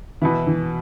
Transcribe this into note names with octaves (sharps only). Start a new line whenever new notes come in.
B2 E3 B3 E4
E3